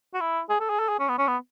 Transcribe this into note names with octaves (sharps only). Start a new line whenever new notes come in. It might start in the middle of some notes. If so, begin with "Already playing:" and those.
F#4
E4
G#4
A4
G#4
A4
G#4
C#4
B3
C#4
B3